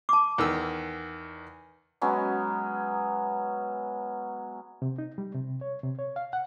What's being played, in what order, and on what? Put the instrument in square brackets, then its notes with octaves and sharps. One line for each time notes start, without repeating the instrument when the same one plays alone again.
[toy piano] A5 D6
[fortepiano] E2 D#3 E6
[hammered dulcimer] F#3 G#3 B3 C#4
[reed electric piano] C3
D#4
G3
C3
C#5
C3
C#5
F5
F#5